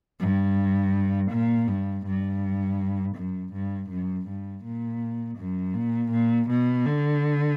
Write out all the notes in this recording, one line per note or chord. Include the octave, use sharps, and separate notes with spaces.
G2
A#2
G2
G2
F#2
G2
F#2
G2
A#2
F#2
A#2
A#2
B2
D3